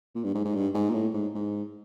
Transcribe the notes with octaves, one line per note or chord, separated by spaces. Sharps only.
A#2
G2
G#2
G#2
G2
G#2
A#2
A2
G#2
G#2